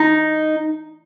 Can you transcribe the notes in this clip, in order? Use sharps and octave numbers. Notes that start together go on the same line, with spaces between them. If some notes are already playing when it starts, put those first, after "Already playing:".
Already playing: D#4